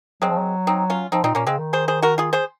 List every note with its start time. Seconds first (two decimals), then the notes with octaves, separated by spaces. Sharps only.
0.22 F#3 G#3 C4
0.30 F3
0.38 F#3
0.67 C4 D#4
0.90 C#4 F4
1.12 F3 C4 D#4
1.24 A#2 C4 D#4
1.35 A#2 A#3 C#4
1.47 C#3 G#3 C4
1.58 D#3
1.73 G#4 C5
1.88 G#4 C5
2.02 F#4 A#4
2.18 F4 G#4
2.33 G#4 C5